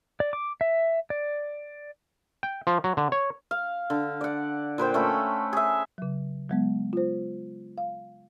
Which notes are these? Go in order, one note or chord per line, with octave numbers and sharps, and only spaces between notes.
D5
D6
E5
D5
G5
F3
F#3
D3
C#5
F5
D3
D5 F#5
A#2 B4 C5 G5
A3 C#4 A4 B5
G#4 E5
C#3 F#3
F#3 G#3 B3
F4 C5
F5